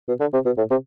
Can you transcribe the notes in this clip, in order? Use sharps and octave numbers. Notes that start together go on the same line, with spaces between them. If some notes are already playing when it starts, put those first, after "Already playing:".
B2
D3
C3
B2
A2
C3